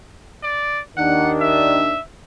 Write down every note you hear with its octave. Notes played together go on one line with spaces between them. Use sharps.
D5
D#2 D#3 D4 F#5
E5